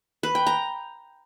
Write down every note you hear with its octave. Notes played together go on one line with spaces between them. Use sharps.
B4
G5
A#5